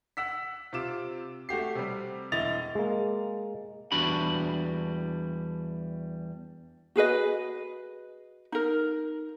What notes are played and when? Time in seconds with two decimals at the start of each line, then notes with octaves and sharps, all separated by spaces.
0.17 F#5 E6 B6
0.73 C3 F4 D6 E7
1.49 A3 F#4 G4 C7
1.75 C3 G3
2.32 E1 E4 D#5 A6 F7
2.75 G#3 A#3
3.92 E2 G3 D4 F#4 B5
6.96 F#4 G#4 B4 D#5
8.52 D#4 A#4